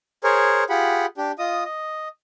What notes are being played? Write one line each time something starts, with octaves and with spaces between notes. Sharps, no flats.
G#4 A#4 C5 C#5
F4 G4 G#4 F#5 B5
D4 G4
F4 D#5 D#6
D#5